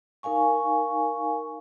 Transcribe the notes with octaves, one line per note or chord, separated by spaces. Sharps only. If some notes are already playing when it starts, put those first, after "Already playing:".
D#4 A#4 F5 G#5 C#6